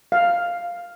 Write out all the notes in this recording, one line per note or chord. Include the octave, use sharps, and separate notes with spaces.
F5